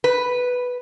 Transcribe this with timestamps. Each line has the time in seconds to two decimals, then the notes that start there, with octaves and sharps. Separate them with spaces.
0.04 B4